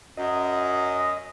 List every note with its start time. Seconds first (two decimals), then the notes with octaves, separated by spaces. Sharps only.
0.17 F#2 D#5